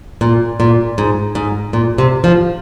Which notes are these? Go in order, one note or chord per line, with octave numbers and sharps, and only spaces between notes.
A#2
A#2
G#2
G#2
A#2
C3
F3